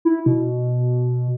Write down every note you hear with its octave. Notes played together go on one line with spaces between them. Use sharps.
E4
B2